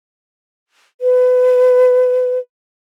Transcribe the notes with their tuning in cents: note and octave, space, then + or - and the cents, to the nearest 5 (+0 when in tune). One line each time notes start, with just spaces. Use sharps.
B4 +25